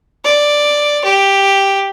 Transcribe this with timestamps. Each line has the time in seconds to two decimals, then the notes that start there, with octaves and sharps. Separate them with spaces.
0.25 D5
1.05 G4